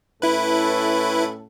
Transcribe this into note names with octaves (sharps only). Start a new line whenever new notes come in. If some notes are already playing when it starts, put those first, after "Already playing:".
A2 C#4 E4 A4 B4